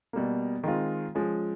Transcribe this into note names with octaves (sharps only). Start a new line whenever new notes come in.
B2 G3 A#3
D#3 G#3 C4 F4
F3 G#3 C#4